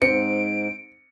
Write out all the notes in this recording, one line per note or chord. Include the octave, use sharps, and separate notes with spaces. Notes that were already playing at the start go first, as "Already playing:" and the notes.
G#2 C4 C#7 D7